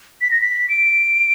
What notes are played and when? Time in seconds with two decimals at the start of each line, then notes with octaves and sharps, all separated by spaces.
0.21 B6
0.31 A#6
0.42 B6
0.69 D7